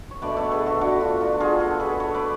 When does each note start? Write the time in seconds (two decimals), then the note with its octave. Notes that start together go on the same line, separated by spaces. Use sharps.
0.11 C#5
0.22 B2 A3 D4 B4 D5
0.37 A4 C#5
0.52 G#4 B4
0.66 F#4 A4
0.81 D4 F#4
0.92 F#4
1.01 F4
1.20 D4 F#4
1.40 F4 G#4
1.60 F#4 A4
1.80 G#4 B4
2.00 A4 C#5
2.14 B4 D5